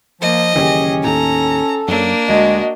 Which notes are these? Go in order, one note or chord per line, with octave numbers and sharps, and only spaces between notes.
F3 A#3 D#5
F#1 D#3 E3 C#4 G4 G#4
D#2 A2 A4 A#5
F#2 F#3 A#3 D4
D2 G#3 F#4 D#5